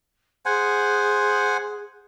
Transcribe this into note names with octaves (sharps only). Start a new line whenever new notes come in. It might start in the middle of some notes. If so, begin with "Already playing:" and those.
G#4 C5 F#5 G#5